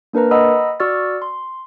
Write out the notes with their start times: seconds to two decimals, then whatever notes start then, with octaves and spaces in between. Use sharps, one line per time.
0.13 A#3 D4 A#4 B4 A#5
0.31 D#5 F#5 A#5 B5 D#6 E6
0.80 F#4 D5 C#6 E6 F6 A6
1.22 C6